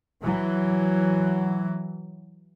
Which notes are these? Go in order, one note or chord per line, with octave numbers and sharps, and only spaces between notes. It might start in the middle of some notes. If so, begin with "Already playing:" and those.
E3 F#3